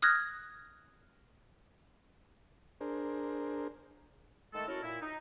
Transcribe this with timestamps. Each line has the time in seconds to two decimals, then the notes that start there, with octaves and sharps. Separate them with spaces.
0.02 D#6 F6 F#6 G#6 A#6
2.81 D4 G#4 A#4 C5
4.53 D#3 G#3 A3 A4
4.67 C#4 E4 F#4 A4 A#4
4.82 A#2 E4
5.00 D#4